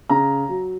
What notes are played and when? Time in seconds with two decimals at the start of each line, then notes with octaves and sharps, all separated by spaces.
0.09 C#3 A#5
0.49 F#3